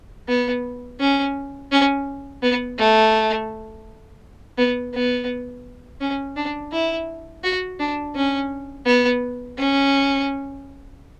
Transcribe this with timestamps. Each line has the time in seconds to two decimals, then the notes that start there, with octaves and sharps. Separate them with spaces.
0.28 B3
1.00 C#4
1.72 C#4
2.42 B3
2.78 A3
4.58 B3
4.94 B3
6.01 C#4
6.36 D4
6.72 E4
7.43 F#4
7.79 D4
8.15 C#4
8.86 B3
9.58 C#4